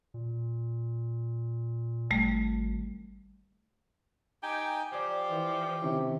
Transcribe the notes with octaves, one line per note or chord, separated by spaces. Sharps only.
A#2
G#1 G3 A3
D#4 G4 G5 G#5
F3 G4 D5 G5
E3
C3 D#3 C#4 E4